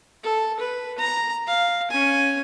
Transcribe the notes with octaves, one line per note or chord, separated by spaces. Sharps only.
A4
B4
A#5
F5
C#4 G#5